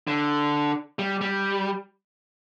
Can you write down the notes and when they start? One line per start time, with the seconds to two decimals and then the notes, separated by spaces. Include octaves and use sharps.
0.07 D3
0.99 G3
1.21 G3